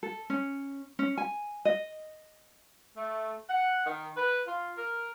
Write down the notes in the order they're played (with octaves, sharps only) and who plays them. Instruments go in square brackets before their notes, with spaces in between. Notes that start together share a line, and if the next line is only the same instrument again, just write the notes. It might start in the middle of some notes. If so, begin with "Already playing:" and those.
[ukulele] A4
C#4
C#4
G#5
D#5
[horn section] A3
F#5
D#3
B4
F4
A#4